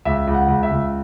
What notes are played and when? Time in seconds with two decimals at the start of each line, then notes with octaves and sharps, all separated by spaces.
0.05 C#2 E5
0.27 C#2
0.34 F#5
0.48 C#2
0.63 E5
0.71 C#2